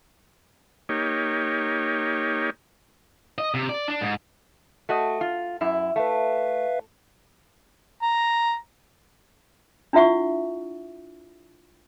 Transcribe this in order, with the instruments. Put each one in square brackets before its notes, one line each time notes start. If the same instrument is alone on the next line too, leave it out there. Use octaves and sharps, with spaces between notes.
[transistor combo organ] A#3 D#4 G4 C#5
[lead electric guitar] D#5
C3
D5
D4
G#2
[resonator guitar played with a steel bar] A3 F#4 D#5
F4
F#2 E4
[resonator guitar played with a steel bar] A3 [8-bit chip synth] B4 E5 F5
[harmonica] A#5
[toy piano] D4 E4 F4 E5 F#5 C#6